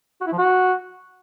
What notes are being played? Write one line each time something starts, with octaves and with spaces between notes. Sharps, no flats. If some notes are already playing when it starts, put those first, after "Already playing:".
F#4
E4
F3
F#4